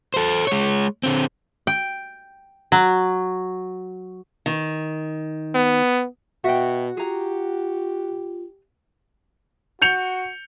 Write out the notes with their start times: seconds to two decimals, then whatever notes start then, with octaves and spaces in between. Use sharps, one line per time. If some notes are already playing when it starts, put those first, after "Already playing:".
0.14 A4 C5
0.47 G#3 C#5
1.03 D3 C4
1.67 G5
2.72 F#3
4.46 D#3
5.55 B3
6.44 B2 F#4 E5 G5
6.97 F4 G4 G#4 A#5
9.82 F#4 G6 C#7 F7